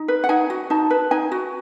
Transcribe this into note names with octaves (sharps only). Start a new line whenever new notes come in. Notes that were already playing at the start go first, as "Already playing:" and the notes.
Already playing: D#4
B4
F#5
D#4 G#5
F#4
D#4 A5
B4
D#4 G#5
F#4